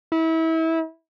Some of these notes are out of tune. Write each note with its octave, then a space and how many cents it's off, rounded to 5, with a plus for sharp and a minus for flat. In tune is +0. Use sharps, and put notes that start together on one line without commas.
E4 -30